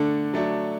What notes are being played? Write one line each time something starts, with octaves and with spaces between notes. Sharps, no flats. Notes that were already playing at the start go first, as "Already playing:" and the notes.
Already playing: D3 A3 D4
F#3 A3 D4